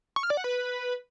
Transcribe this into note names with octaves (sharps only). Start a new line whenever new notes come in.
C#6
F6
D5
F#5
B4